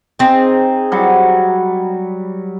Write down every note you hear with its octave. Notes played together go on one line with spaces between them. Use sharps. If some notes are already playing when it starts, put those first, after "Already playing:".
C4 D#4 G#4
F#3 G3